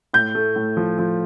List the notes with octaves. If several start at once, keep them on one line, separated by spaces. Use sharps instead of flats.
A2 G6
A3
A2
F3
F3